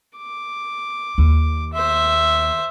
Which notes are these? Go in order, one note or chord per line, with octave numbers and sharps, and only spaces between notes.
D6
D#2
C5 E5